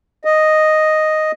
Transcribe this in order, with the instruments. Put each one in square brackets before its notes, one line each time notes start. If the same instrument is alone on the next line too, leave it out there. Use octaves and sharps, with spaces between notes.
[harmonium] D#5